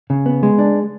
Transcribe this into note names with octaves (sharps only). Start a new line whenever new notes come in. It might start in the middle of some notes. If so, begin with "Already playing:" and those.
C#3
B3
G#3
D4